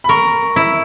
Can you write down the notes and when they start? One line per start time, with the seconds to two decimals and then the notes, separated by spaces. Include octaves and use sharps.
0.04 B5
0.09 A#4 C#6
0.56 E4